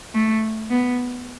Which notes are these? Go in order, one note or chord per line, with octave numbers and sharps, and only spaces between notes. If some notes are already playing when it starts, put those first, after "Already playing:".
A3
B3